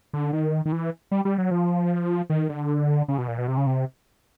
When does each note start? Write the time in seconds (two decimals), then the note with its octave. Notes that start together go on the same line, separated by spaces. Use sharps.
0.13 D3
0.33 D#3
0.65 D#3
0.72 E3
1.11 G3
1.25 G3
1.38 F#3
1.51 F3
2.30 D#3
2.49 D3
3.08 C#3
3.18 B2
3.28 A#2
3.38 B2
3.48 C3
3.57 C#3
3.66 C3